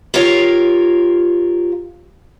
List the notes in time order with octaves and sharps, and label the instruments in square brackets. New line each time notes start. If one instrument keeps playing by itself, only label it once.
[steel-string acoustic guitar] F4 G4 A#4 C#5 F5